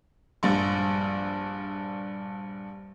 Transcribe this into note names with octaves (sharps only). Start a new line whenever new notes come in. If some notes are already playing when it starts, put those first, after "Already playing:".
A#1 G2 A6